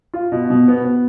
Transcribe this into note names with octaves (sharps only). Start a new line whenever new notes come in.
F4
B2
B2
B3
B3